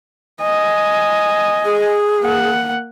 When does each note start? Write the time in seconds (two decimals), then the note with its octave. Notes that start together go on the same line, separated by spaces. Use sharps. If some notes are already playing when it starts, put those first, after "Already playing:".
0.42 D#5 G#5
1.64 G#4
2.21 A#3 F#5